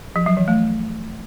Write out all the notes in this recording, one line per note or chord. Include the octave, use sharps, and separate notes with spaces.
F3
F#3
E3
A3